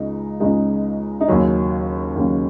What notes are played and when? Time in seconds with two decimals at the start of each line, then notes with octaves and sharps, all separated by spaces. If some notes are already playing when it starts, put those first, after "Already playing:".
Already playing: C#2 C#3 G#3 D#4
0.40 C#2 C#3 G#3 D#4
1.21 D#4
1.28 D#2 C#3 F#3 C#4
2.16 D#2 C#3 F#3